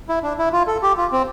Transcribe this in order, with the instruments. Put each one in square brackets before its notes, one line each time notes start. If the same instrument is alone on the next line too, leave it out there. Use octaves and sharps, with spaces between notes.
[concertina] E4
D4
E4
F4
A4
G4
F4
C4